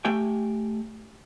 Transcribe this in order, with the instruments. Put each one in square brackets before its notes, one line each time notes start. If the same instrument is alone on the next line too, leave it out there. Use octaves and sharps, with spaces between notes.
[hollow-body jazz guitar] A3 G4 G5 G#5